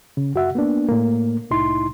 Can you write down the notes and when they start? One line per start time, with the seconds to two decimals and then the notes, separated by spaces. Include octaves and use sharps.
0.17 C#3
0.34 F#2 F#4 E5 F#5
0.55 A#3 B3 D4
0.89 A2 A#3
1.51 C2 A2 D#4 E4 C6